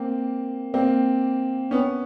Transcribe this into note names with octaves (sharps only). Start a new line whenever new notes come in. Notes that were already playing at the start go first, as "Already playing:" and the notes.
Already playing: A#3 C4
A#3 C4
B3 C#4